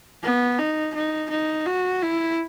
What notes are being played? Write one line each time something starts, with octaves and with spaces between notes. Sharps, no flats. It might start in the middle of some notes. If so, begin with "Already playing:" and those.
B3
D#4
D#4
D#4
F#4
E4